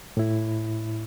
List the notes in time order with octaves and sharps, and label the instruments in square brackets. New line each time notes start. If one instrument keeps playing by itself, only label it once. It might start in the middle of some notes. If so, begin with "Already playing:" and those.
[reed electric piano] A2 E4